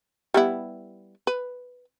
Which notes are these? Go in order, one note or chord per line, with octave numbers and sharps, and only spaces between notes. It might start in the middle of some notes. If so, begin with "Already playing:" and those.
G3 B3 E4
B4